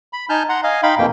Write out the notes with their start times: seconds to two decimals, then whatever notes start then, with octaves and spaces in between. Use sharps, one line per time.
0.13 B5
0.29 D#4 G#5 A5 F6 G6
0.49 F#5 A#5 C6
0.64 D#5 F5 G#5
0.83 D#4 F5 G5 B5 C6
0.98 F2 B2 A#3 G5